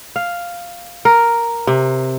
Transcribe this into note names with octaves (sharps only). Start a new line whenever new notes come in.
F5
A#4
C3